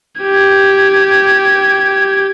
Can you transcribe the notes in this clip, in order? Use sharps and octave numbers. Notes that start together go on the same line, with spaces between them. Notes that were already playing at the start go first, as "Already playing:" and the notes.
G4 G#6